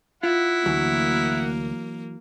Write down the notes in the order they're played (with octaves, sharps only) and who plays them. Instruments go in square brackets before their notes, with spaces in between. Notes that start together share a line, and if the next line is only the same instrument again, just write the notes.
[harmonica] E4 F#5 [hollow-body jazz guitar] F4
[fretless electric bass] D2 [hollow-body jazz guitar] E3 F#3 [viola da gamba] A#3